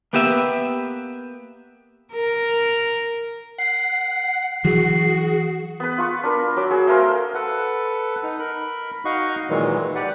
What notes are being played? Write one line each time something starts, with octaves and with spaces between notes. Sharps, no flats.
A#3 B3 G4 B4 E5
A#4
F#5 C7
E3 F#3 F#4 G#4
B3 B4
F4 C#6
D4 A#4 B5
F#3 D6
F#4 G#4
A3 A#4 C5 F5
A4 B4 F#5
D#4
A#4 B5
D#4 F#4 D#5 F5 F#5 C#6
A#2 D#3 E3 F#3 G#3
G4 B4 D5 F#5